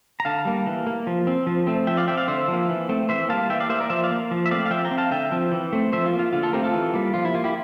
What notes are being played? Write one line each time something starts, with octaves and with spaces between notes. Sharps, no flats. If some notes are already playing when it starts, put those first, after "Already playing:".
A#5
D3 F5 A5
G3 A#3
E3
A#3
F3
C4
F3
A3 C4
F3 E5 G5
D5 F5
C4 E5 G5
D5 F5
D3 C5 E5
F3
A#3
E3
A3 C4
E3 C5 E5
G3 A#3 F5 A5
E3 E5 G5
D5 F5
A#3 C5 E5
A#4 D5
F3 C5 E5
D5 F5
A#3
F3
E5
A3 C4 D5 F5
F5
F3 E5 G5
G5 A#5
C4
F5 A5
D3 E5 G5
F3 C4
E3
A3 C4
F3 C5 E5
F4
A#3
F4
D3 F4
F4 A4
A3 C4 G4 A#4
F4 A4
E3
G3 A#3
F3 F4
E4
A#3 F4
E4 G4